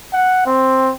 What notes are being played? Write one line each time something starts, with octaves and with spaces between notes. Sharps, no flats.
F#5
C4